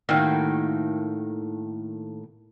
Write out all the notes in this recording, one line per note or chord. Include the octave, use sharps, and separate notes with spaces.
A2 D#3 A#3 D#4 F#4 G5